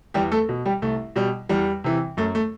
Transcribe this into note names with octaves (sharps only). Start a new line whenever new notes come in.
E2 G3 G4
A3 A4
B2
G3 G4
C2 A3
B2 G3
E2 G3
C3 E3
F#2 A3
A3